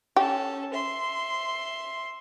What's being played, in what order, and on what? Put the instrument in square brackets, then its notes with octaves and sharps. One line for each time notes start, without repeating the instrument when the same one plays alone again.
[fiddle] C#4 A4 [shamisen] G4
[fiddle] E5 C6